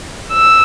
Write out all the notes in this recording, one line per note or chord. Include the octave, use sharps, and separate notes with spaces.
E6